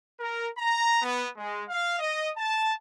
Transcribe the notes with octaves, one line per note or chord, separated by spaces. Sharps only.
A#4
A#5
B3
G#3
F5
D#5
A5